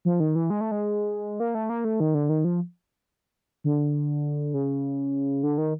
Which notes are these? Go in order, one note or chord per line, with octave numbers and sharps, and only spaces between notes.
F3
D#3
E3
G#3
A3
G#3
A#3
A3
A#3
A3
D#3
D3
D#3
F3
D3
C#3
D3
D#3